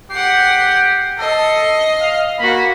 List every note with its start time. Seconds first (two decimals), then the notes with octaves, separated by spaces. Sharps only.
0.11 G4 F#5 C7
1.18 A4 D#5 C7
2.01 F5
2.39 A#3 F#4 B5